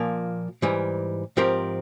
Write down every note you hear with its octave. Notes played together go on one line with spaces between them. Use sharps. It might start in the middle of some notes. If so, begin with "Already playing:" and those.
Already playing: A#2 F3 A#3
G#2 E3 G3
G#2 F3 C4 G4 A#4